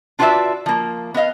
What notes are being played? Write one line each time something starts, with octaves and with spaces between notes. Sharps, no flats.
D4 F4 F#4 B4 D5 E5
F3 A#3
B3 B4 D#5 F5